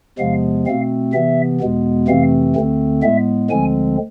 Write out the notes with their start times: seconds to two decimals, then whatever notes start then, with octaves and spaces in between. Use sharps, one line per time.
0.18 E2 C3 F3 G#3 B3 F5
0.66 B2 A3 C4 F5
1.13 C3 E3 B3 E5
1.60 E2 B2 G#3 B3
2.08 F2 C3 E3 A3 C4 F5
2.56 D2 D3 A3 C4
3.03 A2 G#3 B3 E5
3.50 D2 D3 F3 G#3 C4 G#5